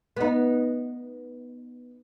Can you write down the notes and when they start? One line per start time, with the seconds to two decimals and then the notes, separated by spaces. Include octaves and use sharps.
0.16 B3 D#4